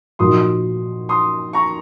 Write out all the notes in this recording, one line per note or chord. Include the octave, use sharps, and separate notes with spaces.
A#2 F3 A#3 D#4 F#4 C6 D#6
C6 D#6
A#5 C#6